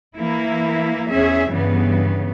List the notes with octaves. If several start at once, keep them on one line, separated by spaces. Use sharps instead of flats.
E3 A#3 E4
E2 C#4 G#4 E5
G2 C#3 E3 B3